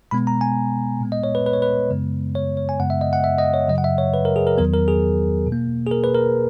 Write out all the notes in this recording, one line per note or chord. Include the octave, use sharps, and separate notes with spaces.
B2 G#3 B3 B5
A#5
G#5
A#2 G#3 B3
D#5
C#5
B4
B4
C#5
B4
F#2 C#3 G#3 B3
C#5
C#5
G#5
F#2 C#3 G#3 B3 F#5
E5
D#5
F#5
E5
D#5
C#5
F#2 C#3 F#3 D#5
F#5
E5
C#5
B4
A#4
G#4
A#4
E2 D#3 F#3 B3 A#4
A#4
G#4
B2
A#3
G#4
A#4
B4
A#4